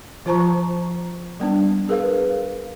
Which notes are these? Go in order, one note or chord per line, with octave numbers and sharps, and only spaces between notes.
F3 F4 C5 A5 A#5 C#6
G3 B3 D4
G#4 A#4 B4 F5